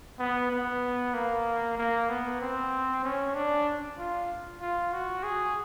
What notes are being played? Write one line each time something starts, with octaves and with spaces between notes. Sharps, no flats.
B3
B3
A#3
A#3
B3
C4
C#4
D4
F4
F4
F#4
G#4